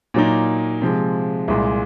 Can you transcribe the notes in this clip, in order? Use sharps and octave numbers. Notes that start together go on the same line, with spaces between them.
A#2 F#3 A#3 D#4
C3 F3 G#3
C2 A#2 G#3